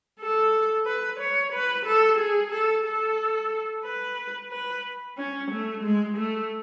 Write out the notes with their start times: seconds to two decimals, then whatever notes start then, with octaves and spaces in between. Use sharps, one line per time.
0.20 A4
0.86 B4
1.20 C#5
1.53 B4
1.86 A4
2.18 G#4
2.52 A4
2.86 A4
3.85 B4
4.51 B4
5.18 C#4
5.51 A3
5.83 G#3
6.17 A3